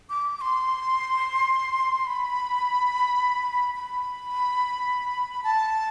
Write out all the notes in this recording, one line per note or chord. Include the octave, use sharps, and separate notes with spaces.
D6
D6
C6
B5
B5
A5